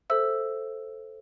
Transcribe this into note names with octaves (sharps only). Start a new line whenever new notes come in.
A4 C5 E5 E6